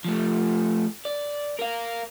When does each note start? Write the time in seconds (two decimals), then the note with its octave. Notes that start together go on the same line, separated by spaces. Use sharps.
0.05 F3 A3
1.05 D5
1.59 A#4 F5